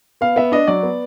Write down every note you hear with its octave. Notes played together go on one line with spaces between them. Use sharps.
B3 F5
B3 E5
D4 D#5
F#3 D5
B3